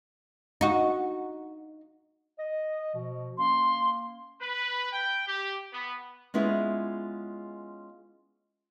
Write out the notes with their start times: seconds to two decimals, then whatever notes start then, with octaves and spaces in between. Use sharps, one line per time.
0.61 D#4 F#4
2.39 D#5
2.94 B2 F3
3.38 A#3 C#4 C6
4.41 B4
4.92 G5
5.28 G4
5.73 B3
6.34 G#3 B3 C#4 E4 F4 G#4